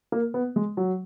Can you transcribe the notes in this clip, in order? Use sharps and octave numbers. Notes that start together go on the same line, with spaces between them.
A#3
B3
G#3
F#3